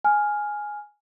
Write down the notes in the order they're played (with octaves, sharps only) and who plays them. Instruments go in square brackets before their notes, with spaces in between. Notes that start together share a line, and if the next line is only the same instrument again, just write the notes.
[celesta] G#5 F6